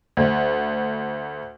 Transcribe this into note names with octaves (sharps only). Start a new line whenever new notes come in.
D2